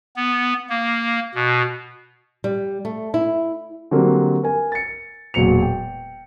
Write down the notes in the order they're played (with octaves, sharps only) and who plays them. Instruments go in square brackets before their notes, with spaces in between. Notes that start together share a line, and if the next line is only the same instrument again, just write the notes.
[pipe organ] B3
A#3
B2
[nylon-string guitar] G3
A3
E4
[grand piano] D3 F#3 G3 A#3 C4
A#4 G#5
A6 C#7
E1 A#2 F#3 C#7 F7
G5